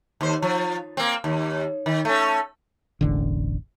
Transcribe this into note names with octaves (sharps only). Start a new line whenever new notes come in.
D#2 C5
F3
A#3 C4
D#2
D#3
A3 C#4
E1 A1 D3